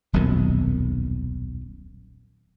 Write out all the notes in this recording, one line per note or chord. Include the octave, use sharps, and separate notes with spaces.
D#1 B1 F2 D#3